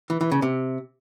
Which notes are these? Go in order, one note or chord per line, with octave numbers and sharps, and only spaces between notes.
E3
E3
C#3
C3